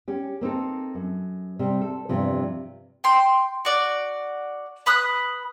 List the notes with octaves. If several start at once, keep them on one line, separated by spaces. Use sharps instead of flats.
C#4 G4
A#3 C4 D#4 A4
F#2
C3 G3
A4
E2 G2 C3 F3
G5 C6
F#4 D5
B4 B5 D#6 F#6